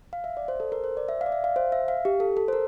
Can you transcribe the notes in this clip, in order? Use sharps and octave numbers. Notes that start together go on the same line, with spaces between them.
F5
E5
D5
C5
A4
A#4
C5
D5
E5
F5
D5
E5
F5
C5
E5
F5
G4
A4
A4
C5
A#4